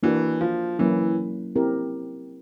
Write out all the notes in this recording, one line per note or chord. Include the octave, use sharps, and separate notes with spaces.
E3 A#3 D4 F#4
F3
E3 F#3 A#3 C#4 E4
C4 E4 G4 A#4